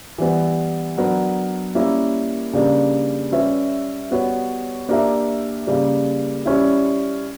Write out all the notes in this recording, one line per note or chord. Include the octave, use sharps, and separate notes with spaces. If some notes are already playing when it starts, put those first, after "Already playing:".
E3 G3 B3
F#3 B3 D4 A#4
G3 A#3 C#4 E4
C#3 G3 A#3 D4 A#4
G3 C#4 G4 B4 E5
G3 B3 F#4 C#5
A#3 D4 G4 A#4 E5
C#3 G3 A#3
G3 C#4 E4